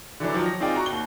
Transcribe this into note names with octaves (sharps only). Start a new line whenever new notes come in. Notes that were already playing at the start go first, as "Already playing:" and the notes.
D3 E3 F#3 D4
D#3 F3 F#3
A#6
C4 D#4 F4 G#4 D5 G5
F#4 A#5 C#6
D#2 G7